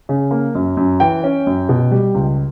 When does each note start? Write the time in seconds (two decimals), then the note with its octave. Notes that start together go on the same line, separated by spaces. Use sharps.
0.09 C#3
0.31 A#3
0.55 F#2
0.77 F#2
1.00 E3 G5
1.24 C#4
1.47 F#2
1.69 B2
1.91 G3
2.14 C#2